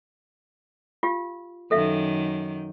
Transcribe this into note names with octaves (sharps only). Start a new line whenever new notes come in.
F4 G4 F5
F#2 D#3 A4 E5 F5